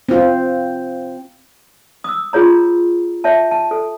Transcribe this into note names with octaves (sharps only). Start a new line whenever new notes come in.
C4 F4
D#6 E6
F4 G#4 C#5 A#5
C#5 E5 A5
A5
A4